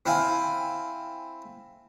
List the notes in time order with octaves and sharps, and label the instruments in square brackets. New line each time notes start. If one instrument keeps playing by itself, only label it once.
[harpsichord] C4 E4 F5 G#5